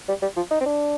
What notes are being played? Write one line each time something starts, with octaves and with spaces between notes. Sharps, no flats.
G3
G3
F3
D#4
C4
D4